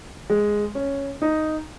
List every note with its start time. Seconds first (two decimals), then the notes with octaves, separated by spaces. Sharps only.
0.30 G#3
0.75 C#4
1.22 D#4